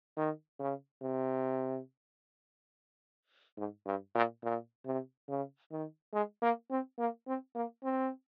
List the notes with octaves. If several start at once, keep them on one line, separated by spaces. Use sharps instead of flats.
D#3
C#3
C3
G#2
G2
A#2
A#2
C3
C#3
D#3
G#3
A#3
C4
A#3
C4
A#3
C4